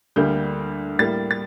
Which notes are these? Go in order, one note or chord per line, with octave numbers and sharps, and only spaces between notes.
D2 D3 G3 A#3 G6
A2 G3 A#3 A6
A6